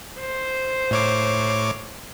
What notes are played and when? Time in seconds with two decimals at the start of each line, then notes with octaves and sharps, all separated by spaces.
0.21 C5
0.91 A2 C#5 D6